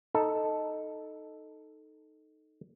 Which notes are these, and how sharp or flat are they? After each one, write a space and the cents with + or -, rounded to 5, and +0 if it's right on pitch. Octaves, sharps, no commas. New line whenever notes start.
D#4 +0 A4 +0